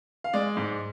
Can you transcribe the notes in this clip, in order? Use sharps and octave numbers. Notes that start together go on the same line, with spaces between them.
F5
G#3 D5
G#2